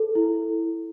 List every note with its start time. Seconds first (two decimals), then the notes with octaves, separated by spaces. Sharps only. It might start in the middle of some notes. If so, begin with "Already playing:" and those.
Already playing: A4
0.15 E4